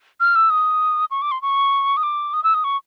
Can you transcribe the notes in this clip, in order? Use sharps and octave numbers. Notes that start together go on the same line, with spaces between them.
F6
E6
D#6
C#6
D6
C6
C#6
D#6
D6
D#6
E6
D#6
C#6